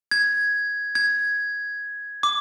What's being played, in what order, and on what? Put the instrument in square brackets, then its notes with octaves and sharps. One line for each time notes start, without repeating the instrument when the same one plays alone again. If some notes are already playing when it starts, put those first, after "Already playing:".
[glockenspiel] G#6
G#6
D6